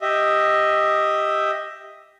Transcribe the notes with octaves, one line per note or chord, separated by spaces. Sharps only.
G4 D#5 E5